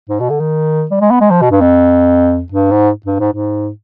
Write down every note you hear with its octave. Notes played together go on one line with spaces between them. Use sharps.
G#2
B2
D3
D#3
G3
G#3
B3
G#3
F3
B2
G2
F2
G2
G#2
G2
G#2
G#2